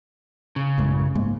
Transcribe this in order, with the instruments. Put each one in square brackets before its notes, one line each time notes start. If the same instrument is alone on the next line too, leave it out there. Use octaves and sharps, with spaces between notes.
[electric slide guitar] C#3
[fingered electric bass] A1 F#2 G#3
G#2 G#3 A#3